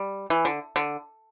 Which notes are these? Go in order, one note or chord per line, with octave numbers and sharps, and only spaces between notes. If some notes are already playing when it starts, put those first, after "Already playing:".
Already playing: G3
E3
D3
D3